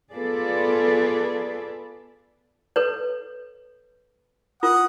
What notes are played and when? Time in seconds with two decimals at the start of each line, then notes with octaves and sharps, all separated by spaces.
0.14 B3 F4 G#4 A4 B4 D5
2.76 A4 B4 C#5
4.63 F4 A#4 F#5 D#6